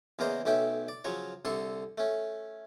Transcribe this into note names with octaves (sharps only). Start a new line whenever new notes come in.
E2 C#3 A#3 A#4 C5 D#5
B1 A3 C#4 E5 G5
D5
C#3 F3 F#3 C#5
C2 D3 A4 C6 C#6
A3 C#4